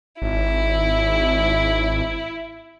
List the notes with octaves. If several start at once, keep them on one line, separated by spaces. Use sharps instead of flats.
G#1 E4